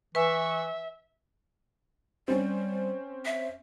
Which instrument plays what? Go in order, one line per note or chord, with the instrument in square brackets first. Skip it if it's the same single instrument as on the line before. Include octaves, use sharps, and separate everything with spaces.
[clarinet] E3 [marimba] B4 G#5 [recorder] E5 [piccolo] C#6
[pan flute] G3 [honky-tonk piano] C4 C#4
[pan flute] E5